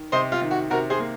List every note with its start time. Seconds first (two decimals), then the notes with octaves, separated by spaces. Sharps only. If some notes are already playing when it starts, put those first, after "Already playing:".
Already playing: D#3
0.12 C3 C5 D#5
0.32 F4
0.41 D#3
0.51 F#4
0.70 C3 F#4 A#4
0.90 G#4 C5
0.99 A#3